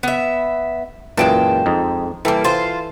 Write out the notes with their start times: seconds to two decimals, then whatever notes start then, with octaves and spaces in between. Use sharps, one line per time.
0.03 B3 E5
1.17 F#2 A#2 E3 G#3 G5 A5
1.66 F2 D#4
2.25 E3 G3 A#3 A4
2.44 F4 C5